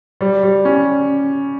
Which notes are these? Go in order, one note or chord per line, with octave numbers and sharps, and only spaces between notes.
G3
G3
C#4